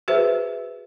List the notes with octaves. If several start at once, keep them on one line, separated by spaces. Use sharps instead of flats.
F#4 G#4 B4 C5 E5